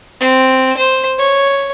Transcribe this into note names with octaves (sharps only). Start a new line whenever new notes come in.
C4
C5
C#5